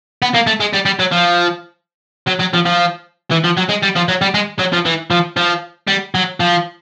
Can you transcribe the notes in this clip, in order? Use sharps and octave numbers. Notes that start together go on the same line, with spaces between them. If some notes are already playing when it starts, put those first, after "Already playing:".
B3
A#3
A3
G#3
G3
G3
F#3
F3
F#3
F#3
F3
F3
E3
F3
F#3
G#3
G3
F3
F#3
G3
G#3
F#3
F3
E3
F3
F3
G3
F#3
F3